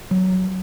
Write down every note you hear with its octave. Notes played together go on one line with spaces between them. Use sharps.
F#3